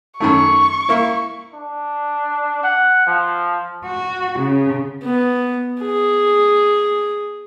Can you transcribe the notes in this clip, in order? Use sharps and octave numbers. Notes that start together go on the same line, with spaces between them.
F#2 D#3 A3 C#6
A#3 E4
D4
F#5
F3
F#4
C#3
B3
G#4